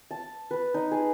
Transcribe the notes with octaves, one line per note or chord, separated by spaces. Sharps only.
A5
B4
D#4
G#4